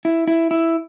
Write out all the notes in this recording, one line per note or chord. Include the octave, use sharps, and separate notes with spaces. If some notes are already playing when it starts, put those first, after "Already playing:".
E4
E4
E4